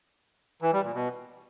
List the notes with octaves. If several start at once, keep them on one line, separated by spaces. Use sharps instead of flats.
E3
G3
A#2
B2